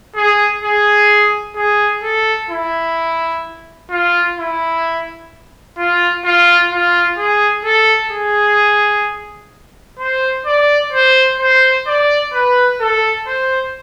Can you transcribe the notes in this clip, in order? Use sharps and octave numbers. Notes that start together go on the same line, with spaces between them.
G#4
G#4
G#4
A4
E4
F4
E4
F4
F4
F4
G#4
A4
G#4
C5
D5
C5
C5
D5
B4
A4
C5